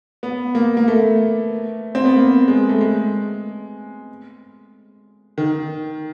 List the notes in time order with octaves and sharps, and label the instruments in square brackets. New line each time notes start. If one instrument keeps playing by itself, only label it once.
[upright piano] B3
A#3
A#3
A3
C4
B3
A#3
G#3
A3
G#3
D#3